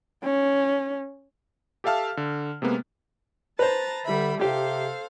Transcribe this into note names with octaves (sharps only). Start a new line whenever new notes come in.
C#4
G4 A4 E5 F5 A5 F6
D3
C3 G#3 A#3 B3
B4 C5 A5 A#5 A6
D3 G3 E5 B5
C3 G4 A4 C5 F5